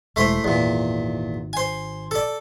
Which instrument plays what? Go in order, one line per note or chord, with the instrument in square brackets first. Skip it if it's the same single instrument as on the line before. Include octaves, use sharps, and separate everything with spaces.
[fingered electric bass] E1 G#3 [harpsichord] A3 E4 C5
[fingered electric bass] G#1 [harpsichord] E2 A#2
[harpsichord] C5 G#5
A4 D5